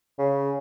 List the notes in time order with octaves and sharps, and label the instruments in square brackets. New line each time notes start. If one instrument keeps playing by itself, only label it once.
[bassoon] C#3